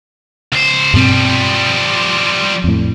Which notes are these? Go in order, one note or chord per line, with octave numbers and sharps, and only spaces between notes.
C#2 C5
G2 B2 F3 G3 C4
F2 A2